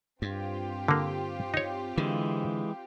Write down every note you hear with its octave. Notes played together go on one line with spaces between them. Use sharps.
G2 C4 F4 G4
D3 A#3
D#4 C#5
D3 E3 G#3